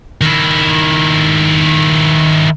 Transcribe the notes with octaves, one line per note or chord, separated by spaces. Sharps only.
D#3 E4